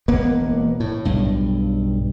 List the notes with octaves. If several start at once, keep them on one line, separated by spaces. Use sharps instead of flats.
E1 A#3 B3
A2
B1 G2